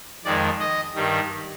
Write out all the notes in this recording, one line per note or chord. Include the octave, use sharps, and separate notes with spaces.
F2 D#3 G#3 D5
D#5
G2 D#3 G3